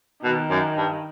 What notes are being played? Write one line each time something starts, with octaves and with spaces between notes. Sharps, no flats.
B2 D#3
F#2
G2